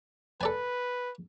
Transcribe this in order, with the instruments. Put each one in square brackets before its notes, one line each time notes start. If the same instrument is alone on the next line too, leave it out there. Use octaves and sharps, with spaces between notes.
[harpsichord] A4 D5 G#5 [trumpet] B4